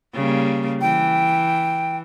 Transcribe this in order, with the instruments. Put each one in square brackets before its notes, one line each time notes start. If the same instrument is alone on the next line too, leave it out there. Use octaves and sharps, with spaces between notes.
[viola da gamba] C#3 G3 A#3
[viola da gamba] E3 [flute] G5